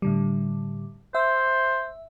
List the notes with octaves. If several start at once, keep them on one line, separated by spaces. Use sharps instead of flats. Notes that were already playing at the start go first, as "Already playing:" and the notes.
A2 D3 G3
C5 E5